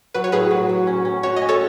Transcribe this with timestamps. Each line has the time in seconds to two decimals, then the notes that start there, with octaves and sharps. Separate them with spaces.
0.14 F#3 B4
0.24 C#5
0.32 A2 G#4 B4
0.51 F#3
0.69 F#3
0.87 C#4
1.05 C#4
1.23 F#4 C#5
1.36 D#5
1.42 C#4
1.49 A4 C#5